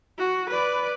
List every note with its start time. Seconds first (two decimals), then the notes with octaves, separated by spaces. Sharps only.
0.18 F#4
0.50 B4 D5